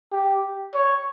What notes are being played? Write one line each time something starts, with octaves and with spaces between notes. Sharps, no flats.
G4
C#5